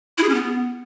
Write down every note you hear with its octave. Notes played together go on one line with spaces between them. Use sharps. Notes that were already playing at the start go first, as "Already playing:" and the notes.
E4
G#4
C#4
B3